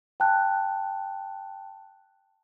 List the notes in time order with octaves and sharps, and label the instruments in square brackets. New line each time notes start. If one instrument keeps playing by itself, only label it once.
[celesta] G5 A5 F#6